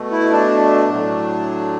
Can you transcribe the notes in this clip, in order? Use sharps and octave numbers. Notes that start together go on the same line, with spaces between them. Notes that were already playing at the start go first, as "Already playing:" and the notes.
Already playing: B2 A3
E4
D4
A2 F#3 A3